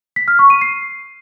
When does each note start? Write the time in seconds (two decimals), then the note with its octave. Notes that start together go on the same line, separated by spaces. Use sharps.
0.16 B6
0.28 F6
0.39 C#6
0.50 D#7
0.61 C7